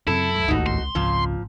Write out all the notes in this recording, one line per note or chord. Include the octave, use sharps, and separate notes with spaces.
F#2 C#3 C4 E4 A4
C#2
G#1 D#2 A2 D#4 F#4
C6
G#1 C#2 A#2 F3